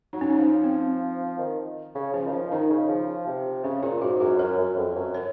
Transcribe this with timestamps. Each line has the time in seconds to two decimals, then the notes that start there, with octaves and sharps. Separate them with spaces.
0.13 F#3 D#4
0.21 C#4
0.30 D#4
0.38 F3 C#4
0.64 C4
1.38 D#3
1.95 C#3
2.13 F3 C#4
2.26 D#3
2.33 F3
2.51 D#3 D#4
2.70 C#3
2.88 F3
3.26 C3
3.64 C#3 C#4
3.83 A#2 F4
4.01 G#2 F#4
4.20 F#2 F#4
4.39 F#2 A#4
4.58 F#2
4.76 F2
4.95 F#2
5.15 C#5